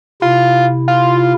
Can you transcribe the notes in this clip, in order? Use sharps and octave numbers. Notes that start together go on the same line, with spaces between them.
C3 E4 F4
F4